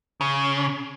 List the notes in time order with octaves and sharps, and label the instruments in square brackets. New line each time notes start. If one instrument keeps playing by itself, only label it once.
[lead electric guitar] C#3